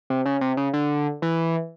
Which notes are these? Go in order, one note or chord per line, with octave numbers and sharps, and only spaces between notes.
C3
C#3
C3
C#3
D3
E3